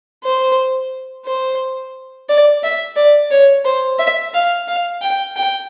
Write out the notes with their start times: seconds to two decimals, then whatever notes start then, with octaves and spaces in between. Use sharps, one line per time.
0.24 C5
1.26 C5
2.29 D5
2.63 E5
2.97 D5
3.31 C#5
3.65 C5
3.99 E5
4.34 F5
4.68 F5
5.02 G5
5.36 G5